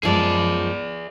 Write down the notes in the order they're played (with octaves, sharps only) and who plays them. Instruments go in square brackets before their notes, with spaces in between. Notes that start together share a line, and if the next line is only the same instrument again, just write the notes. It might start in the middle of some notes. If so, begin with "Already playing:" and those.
[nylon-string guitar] F#2 F3 G#3 [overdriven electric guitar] G#4 D5